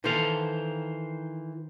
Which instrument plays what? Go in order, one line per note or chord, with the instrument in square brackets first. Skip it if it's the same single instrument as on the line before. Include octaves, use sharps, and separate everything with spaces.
[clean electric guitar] D#3 C5 F5 [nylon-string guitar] E3 A4